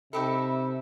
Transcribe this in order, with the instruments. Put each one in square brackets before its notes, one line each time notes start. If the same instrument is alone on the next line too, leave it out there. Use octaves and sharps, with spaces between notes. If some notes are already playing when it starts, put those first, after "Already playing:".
[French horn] C3 [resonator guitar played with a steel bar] D#4 G4 A4 [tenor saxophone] E5 [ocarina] B5